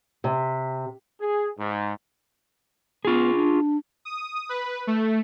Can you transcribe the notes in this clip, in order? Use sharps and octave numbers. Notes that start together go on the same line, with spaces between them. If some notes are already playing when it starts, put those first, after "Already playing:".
C3
G#4
G#2
B3 F4 G#4
D4
D#6
B4
A3